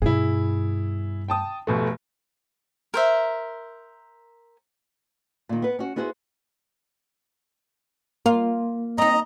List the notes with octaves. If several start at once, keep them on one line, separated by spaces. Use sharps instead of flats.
G2 B2 E4 G#4
G5 A5 D#6
F1 B2 A3
A#4 C5 E5
A#2 D#3
B3 B4
C#4 F#4
B3 E4 F#4 G#4 C5
A#3 F4
C4 D#4 D#5 A#5